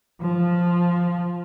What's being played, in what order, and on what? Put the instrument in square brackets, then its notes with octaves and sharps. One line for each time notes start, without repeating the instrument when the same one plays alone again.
[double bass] F3